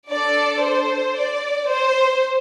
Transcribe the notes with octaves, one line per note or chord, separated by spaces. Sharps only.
D4 A4 D5
C5
D5
C5